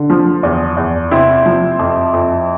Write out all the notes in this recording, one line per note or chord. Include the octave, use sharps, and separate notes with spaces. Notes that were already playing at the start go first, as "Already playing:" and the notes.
Already playing: D3
F3
E2
E2
C3 C4 E4
F3
F2
F2